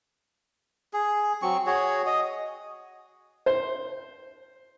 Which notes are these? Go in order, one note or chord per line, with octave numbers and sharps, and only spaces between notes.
G#4
F#3 C4 C#6
F#4 G#4 C#5
D#5
C5